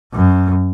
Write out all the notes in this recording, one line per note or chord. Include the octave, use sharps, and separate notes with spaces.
F#2